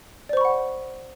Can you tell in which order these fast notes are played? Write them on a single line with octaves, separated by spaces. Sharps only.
D5 C5 C#6 B5 F#5